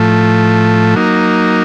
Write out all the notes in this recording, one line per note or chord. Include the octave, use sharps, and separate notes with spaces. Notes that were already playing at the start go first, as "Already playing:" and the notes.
Already playing: A2 F3 A3
F#3 A#3 D#4